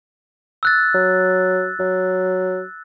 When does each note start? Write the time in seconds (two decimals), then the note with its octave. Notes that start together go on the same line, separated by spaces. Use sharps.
0.63 E6 F#6 A6
0.94 F#3
1.79 F#3